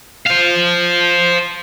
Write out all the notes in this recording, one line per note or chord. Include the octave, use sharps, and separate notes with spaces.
C5 F5